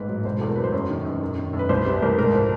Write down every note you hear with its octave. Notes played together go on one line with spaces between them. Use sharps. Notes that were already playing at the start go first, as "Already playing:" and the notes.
Already playing: A1 G#2 B4
F#3
E1 C5
E2 A4
A#4
F#3 B4
C5
F#2 C#5
D#3
F#2
F#2
D#3
F#2
B4
C2 C5
C3 B4
C2 A#4
G#2 A#4
F3